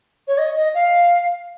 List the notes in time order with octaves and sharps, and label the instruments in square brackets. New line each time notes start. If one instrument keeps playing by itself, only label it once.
[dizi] C#5
D#5
D#5
F5